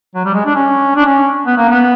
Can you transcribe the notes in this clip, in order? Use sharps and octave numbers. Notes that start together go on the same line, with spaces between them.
F#3
G3
G#3
D4
C#4
D4
C#4
B3
A#3
B3